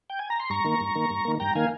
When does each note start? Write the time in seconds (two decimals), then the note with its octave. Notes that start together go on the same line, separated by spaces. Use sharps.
0.10 G5
0.19 G#5
0.30 A#5
0.40 C6
0.50 G2 A#5 C#6
0.64 D#3 A#3
0.81 G2
0.95 D#3 A#3
1.10 G2
1.25 D#3 A#3
1.40 G2 G5 A#5
1.55 D#3 A#3 F5 G#5